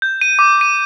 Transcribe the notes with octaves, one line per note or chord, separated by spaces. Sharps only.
G6
D#7
D6
D#7